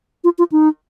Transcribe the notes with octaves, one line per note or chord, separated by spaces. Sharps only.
F4
F4
D#4